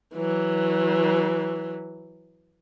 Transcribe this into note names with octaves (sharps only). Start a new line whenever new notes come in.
E3 F#3